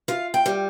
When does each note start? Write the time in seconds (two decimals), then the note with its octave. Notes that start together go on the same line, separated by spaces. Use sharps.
0.08 F4 F5
0.34 G5
0.46 G3